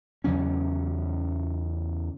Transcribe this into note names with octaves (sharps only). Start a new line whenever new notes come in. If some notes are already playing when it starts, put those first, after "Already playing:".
E2 C#3 F#3 C#4